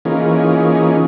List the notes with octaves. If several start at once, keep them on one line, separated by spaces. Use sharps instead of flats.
E3 A#3 C#4 D#4 F4 G#4